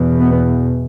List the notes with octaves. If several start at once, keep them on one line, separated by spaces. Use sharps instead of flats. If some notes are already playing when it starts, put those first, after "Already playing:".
Already playing: E2 B2
B3